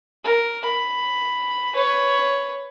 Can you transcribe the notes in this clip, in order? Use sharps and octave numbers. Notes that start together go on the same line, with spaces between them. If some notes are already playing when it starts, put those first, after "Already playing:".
A#4
B5
B4 C#5